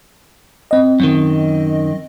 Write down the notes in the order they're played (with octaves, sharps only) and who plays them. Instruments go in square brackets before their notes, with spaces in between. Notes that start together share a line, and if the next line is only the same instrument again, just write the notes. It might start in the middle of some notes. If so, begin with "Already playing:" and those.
[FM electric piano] C4 D#5
[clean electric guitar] F#2 D#3